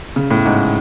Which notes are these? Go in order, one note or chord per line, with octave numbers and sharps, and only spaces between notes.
C#3
A2
G#2